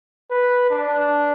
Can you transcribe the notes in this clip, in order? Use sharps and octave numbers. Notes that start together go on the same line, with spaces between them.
B4
D4